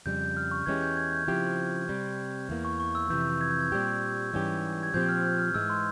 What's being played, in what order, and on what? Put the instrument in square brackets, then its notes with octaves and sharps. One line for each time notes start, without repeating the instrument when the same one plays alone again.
[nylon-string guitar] F2 C#3 G3 [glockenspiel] G6
[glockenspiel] G6
F6
C#6
[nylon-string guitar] E2 E3 G#3 C#4 G4 [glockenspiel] G#6
[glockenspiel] G6
G#6
G6
[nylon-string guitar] C#3 F3 C4 E4 G4
C3 G3 C4
E2 E3 A#3
[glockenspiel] C#6
C#6
E6
[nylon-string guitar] F2 C3 E3 [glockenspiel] G6
[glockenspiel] G#6
G6
G#6
[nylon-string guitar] A#2 G3 C4 G4 [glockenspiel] G6
[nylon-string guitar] G#2 E3 G3 C#4 G4
[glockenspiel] G#6
[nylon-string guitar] A#2 F3 C4 G4 [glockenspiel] G6
[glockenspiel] F6
G6
F6
[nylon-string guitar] G#2 E3 G#3 [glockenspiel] E6
[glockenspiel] C6